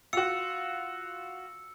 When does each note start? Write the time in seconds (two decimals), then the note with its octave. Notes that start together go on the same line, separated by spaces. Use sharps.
0.13 F4 F#4 E6 C#7